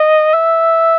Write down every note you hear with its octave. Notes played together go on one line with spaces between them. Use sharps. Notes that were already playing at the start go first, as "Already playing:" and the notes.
Already playing: D#5
E5